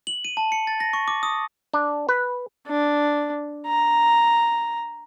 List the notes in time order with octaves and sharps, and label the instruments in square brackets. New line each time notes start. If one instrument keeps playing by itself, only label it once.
[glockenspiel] F#7
D#7
A5
C#7
A6
A#6
C#6
D6
D#6
[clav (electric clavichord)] D4
B4
[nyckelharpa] D4
A#5